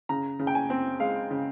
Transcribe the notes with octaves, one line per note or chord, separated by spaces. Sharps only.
C#3 A#5
C#3
G5
G#5
C4
G#3 F5
C#3